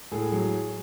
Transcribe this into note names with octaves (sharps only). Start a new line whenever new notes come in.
A2 G#4
F#3